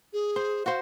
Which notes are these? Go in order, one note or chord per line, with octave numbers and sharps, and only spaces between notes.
G#4
C5
F#4 C5 F5